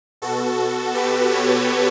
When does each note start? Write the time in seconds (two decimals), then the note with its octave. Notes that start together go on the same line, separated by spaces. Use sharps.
0.22 B2 F#4 A4
0.94 G4 B4
1.31 A4 C#5